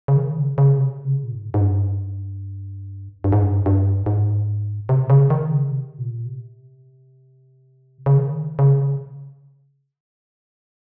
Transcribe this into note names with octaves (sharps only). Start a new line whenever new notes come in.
C#3
D#3
C#3
C#3
C3
C#3
A#2
G#2
G#2
G2
G2
G#2
G2
G2
G#2
C3
C#3
D#3
C#3
C3
A#2
C3
C#3
D#3
C#3